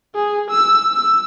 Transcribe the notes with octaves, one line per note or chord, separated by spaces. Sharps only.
G#4
E6
E6